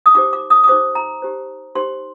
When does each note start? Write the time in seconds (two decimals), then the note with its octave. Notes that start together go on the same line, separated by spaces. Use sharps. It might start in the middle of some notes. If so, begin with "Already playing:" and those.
0.06 D#6
0.15 D#4 G4 C5 D6
0.33 D6
0.50 D#6
0.64 D#6
0.68 D#4 G4 C5 D6
0.95 A#5
1.22 D#4 G4 C5
1.75 D#4 G4 C5 C6